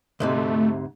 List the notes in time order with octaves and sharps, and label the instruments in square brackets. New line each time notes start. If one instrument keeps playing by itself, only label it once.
[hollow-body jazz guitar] D2 G#2 C3 [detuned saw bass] A3